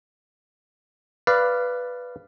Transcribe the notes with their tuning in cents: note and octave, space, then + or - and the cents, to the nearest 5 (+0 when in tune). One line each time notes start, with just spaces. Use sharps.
B4 +0 D5 +0 F5 -15